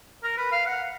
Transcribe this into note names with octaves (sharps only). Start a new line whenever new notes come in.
A#4
B4
F5
F#5